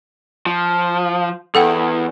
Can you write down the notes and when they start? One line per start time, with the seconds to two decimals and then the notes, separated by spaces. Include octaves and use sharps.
0.46 F3
1.55 E2 A4 F#5 G5